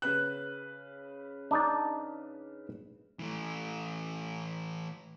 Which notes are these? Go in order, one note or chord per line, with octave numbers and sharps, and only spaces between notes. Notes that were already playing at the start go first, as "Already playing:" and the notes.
C#3 B4 F#6
D4 D#4 D5
E3 A3